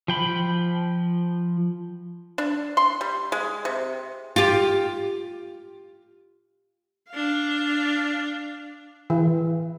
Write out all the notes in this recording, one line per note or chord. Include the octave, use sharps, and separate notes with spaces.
F3 G5 B5
D4
C6
G3
G#3
C3
F4 G4
D4 F5
E3